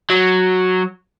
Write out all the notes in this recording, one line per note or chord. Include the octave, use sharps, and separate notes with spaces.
F#3